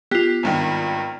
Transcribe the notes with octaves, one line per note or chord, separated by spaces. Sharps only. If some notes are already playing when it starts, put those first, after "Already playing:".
B3 F4 G4
G#1 G2 D#3